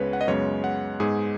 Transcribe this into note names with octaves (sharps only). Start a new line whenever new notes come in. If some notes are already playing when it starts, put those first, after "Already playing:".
Already playing: C#2 C#3 G#3 B3 B4 C#5
F#5
D#5
F#2 C#3 G#3 B3 C#5
F#5
G#2 G#3 B3 G#4